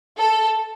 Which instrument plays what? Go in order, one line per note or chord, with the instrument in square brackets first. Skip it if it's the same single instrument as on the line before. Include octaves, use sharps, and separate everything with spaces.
[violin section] A4